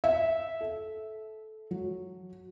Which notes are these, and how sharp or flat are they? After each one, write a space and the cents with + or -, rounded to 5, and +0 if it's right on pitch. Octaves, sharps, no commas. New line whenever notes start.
E5 -10
A4 -20
F#3 -10